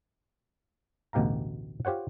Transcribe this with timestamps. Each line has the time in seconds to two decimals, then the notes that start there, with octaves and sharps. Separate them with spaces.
1.13 A1 D2 B2 G4 F5 A#5
1.85 F4 G4 C5 C#5 F#5